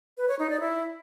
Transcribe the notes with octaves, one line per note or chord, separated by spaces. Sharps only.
B4
C#5
D#4
D5
E4